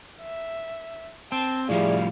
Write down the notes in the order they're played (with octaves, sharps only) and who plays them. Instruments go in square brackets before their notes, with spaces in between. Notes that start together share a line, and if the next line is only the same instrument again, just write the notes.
[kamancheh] E5
[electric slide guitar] C4 [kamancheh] A5
[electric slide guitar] A2 F3 G3 [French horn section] E4 G#4 D5 [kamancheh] F5